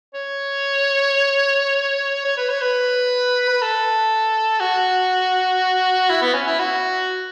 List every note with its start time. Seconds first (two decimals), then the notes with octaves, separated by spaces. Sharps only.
0.14 C#5
2.25 C#5
2.37 B4
2.49 C#5
2.62 B4
3.49 B4
3.62 A4
4.60 F#4
6.10 E4
6.22 B3
6.34 C#4
6.47 E4
6.59 F#4